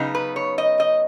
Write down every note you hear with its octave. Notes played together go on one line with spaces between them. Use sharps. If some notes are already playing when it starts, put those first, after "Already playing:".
Already playing: C#3 F#3 B3 D#4
B4
C#5
D#5
D#5